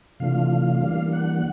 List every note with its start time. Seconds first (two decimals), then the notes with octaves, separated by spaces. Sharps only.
0.20 C3 E3 A3 D4 F4 F5
0.81 E3 G3 A#3 D4
1.12 F#5